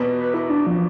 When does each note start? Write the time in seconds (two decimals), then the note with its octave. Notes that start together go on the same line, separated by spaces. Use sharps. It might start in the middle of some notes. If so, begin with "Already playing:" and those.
Already playing: E2 B2 B3
0.18 B4
0.34 E4
0.50 D4
0.67 F3